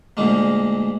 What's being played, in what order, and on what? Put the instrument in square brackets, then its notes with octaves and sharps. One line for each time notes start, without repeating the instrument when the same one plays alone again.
[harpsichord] D2 A#2 D3 G#3 A#3